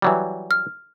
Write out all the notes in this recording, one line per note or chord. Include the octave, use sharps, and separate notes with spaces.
E3 F#3 G3
F6